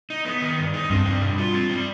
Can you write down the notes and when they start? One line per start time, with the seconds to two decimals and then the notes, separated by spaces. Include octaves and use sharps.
0.10 D#4
0.25 B3
0.42 D#3
0.58 G2
0.74 D#4
0.90 G2 C4
1.06 G3
1.21 B2
1.38 F4
1.54 C4
1.70 G3